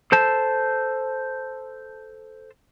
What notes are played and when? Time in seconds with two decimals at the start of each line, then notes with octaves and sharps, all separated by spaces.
0.12 A4 C5 A5